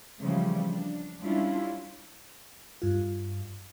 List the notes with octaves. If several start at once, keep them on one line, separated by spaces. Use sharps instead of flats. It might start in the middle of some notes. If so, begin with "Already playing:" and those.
C#3 E3 F3 G3 A3
D4
G3 C#4 D4 E4 F4
G2 F4